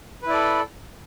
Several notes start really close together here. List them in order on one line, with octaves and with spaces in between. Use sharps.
B4 E4 D5 A4